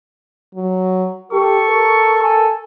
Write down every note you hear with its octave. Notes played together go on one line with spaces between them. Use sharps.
F#3
G4 A4 C#6
A#4
A4 G#5